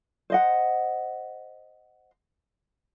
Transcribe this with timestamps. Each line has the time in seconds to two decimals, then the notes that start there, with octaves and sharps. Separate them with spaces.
0.30 C5 D#5 F#5